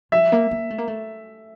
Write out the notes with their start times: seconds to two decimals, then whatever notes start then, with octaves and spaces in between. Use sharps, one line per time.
0.12 F3 E5
0.32 A#3
0.51 A#3
0.70 A3
0.78 A#3
0.87 A3